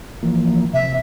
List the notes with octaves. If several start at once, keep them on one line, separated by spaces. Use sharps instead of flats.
E3 F3 A#3
C3 E5